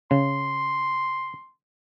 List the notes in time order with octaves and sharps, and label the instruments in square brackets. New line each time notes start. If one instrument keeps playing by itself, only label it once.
[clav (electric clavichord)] C#3 [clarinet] C6